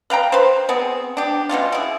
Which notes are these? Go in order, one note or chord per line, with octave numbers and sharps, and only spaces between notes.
B4 F5 G5 A#5
B4 C5
B3 C4 G#4
D4 G4
B2 B3 C#4 F4
E4 G#4